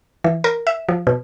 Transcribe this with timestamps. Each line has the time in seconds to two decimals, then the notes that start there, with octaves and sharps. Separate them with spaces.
0.24 E3
0.44 A#4
0.67 E5
0.89 F3
1.07 B2